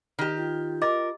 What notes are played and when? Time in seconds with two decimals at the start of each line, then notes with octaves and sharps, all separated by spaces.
0.19 D#3 G4
0.37 F4
0.82 A#4 D#5 D6 A6